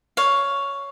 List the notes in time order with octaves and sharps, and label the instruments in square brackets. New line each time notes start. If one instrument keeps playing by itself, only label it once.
[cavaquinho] C#5 F5